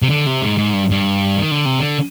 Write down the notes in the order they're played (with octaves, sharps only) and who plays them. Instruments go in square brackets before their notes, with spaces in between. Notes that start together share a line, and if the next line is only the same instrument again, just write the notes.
[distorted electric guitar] C3
D3
C3
G#2
G#2
G2
G2
D#3
D3
C3
D3